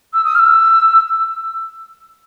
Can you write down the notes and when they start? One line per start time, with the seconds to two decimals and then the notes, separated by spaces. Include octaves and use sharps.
0.13 E6
0.24 D#6
0.35 F6
0.39 E6